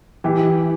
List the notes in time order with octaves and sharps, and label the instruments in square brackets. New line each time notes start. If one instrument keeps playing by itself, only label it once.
[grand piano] E3 [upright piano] G4